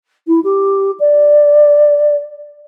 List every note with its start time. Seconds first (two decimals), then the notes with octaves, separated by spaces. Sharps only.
0.27 E4
0.44 G4
1.00 D5